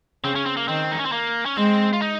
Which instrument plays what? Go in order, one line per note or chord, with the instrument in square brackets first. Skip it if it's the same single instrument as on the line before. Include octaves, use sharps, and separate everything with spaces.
[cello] C#3 [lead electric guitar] C4
[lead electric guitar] C#4
C4
A#3
[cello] D#3 [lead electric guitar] C4
[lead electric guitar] D#4
C#4
C4
A#3
C#4
[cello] G#3 [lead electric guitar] C4
[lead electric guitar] F4
D#4